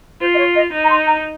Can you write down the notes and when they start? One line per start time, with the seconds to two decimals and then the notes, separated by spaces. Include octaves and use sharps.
0.21 F4 C5
0.34 D#5
0.38 C#5
0.55 D#5
0.73 D#4
0.84 A#5
0.90 C6
1.07 A#5